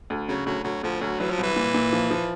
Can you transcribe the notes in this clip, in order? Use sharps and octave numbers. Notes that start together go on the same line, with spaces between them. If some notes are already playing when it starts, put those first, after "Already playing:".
D2
C#3 F#3
D2 F#3
D2 F#3
D2 F3
D2 F#3
E3 F#3
F3
C2 E3
A#2
A#2
F3
F3